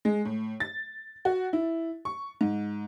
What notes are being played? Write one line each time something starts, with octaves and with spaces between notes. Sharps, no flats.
G#3
A2
A6
F#4
E4
C#6
G#2